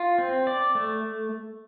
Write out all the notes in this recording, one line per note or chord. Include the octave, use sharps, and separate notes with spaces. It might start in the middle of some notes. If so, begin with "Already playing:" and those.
Already playing: F4
C4
D5
A3